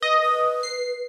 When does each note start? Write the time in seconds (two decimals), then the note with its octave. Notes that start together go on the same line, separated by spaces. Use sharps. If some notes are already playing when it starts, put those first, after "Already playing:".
0.02 B4 D#5
0.20 B4
0.63 C7